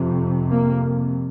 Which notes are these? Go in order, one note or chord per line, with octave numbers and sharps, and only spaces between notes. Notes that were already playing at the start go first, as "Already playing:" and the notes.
Already playing: F2 C3
A#3